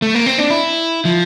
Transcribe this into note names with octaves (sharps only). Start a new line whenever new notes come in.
A3
A#3
C4
D4
E4
F3